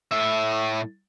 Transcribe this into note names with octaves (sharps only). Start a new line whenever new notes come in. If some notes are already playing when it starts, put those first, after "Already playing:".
A2 E5